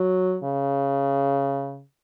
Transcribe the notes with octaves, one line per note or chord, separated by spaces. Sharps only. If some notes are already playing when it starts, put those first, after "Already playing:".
Already playing: F#3
C#3